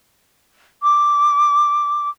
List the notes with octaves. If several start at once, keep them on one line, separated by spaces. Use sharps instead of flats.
D6